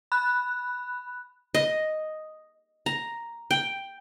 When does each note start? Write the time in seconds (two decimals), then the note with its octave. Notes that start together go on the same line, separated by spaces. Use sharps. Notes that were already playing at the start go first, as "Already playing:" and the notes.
0.12 B5 F#6
1.54 D#5
2.86 A#5
3.51 G5